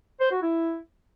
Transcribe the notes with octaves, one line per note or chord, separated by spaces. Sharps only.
C5
F#4
E4